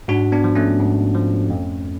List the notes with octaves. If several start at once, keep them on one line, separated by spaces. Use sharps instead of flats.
G#2 D4 F#4
B3 D4
F3
A3 C#4
G#2
F3
F2